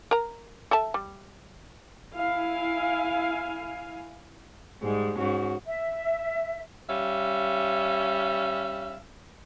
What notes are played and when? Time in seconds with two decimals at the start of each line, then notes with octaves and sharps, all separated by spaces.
0.11 A#4 A#5
0.71 A4 E5 A5
0.94 G3
2.14 E4 F5 G#5
4.83 G#2 G3 G#3
5.18 G#2 C#4 F#4
5.66 E5
6.89 G3 C#4 E5 F5